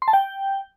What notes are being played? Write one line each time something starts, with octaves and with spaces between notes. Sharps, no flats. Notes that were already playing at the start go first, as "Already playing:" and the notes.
C6
A5
G5